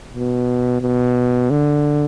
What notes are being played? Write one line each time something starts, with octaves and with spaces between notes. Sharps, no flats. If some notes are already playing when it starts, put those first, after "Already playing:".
B2
B2
D3